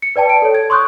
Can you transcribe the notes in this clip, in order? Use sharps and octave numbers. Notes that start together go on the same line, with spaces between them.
C#7
B4 D5 G5 A5
D7
A4 C#5
G#6
C6 C#6 D#6 F#6 G6